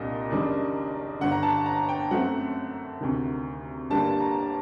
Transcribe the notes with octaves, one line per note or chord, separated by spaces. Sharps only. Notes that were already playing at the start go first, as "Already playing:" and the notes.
Already playing: C2 A#2 G3 D4 D#5
F#1 F#2 D#3 G3 D4
G1 G2 D3 F#5
A#5
A5
A#5
G5
F#2 F#3 A3 C4 F#5
D2 C3 D#3
G1 G2 D3 G3 A#3 A5
A#5